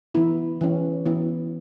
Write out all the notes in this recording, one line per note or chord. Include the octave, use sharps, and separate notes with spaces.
E3 B3 E4
E3 C#4
E3 B3 E4